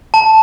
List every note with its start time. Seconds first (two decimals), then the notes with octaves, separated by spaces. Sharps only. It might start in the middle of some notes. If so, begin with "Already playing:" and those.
0.14 A5